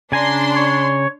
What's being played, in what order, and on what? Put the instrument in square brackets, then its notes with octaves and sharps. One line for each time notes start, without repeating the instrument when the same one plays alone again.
[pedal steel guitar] C#3 G#5 A#5 [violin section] D4 C6
[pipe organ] C#5